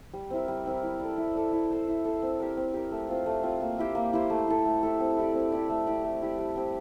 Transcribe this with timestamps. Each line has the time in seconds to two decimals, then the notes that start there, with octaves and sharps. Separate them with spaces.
0.14 G3
0.30 C4 E4 A#4
0.48 G3
0.66 C4 E4 A#4
0.83 E4
1.00 A4 D5
1.18 E4
1.35 A4 D5
1.53 E4
1.70 A4 C5
1.88 E4
2.05 A4 C5
2.22 C4
2.40 G4 A#4
2.57 C4
2.74 G4 A#4
2.91 A3
3.09 C4 F4
3.26 A3
3.43 C4 F4
3.61 A#3
3.79 E4 G4 C5
3.95 A#3
4.13 E4 G4 C5
4.30 A3
4.48 E4 A4
4.65 A3
4.83 E4 A4
5.00 C4
5.17 E4 G4 D5
5.34 C4
5.52 E4 G4 D5
5.70 A3
5.87 E4 G4 D5
6.04 A3
6.22 E4 G4 D5
6.38 G3
6.56 C4 G4